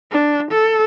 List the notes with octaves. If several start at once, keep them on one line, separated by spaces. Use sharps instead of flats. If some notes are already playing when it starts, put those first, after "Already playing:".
D4
A4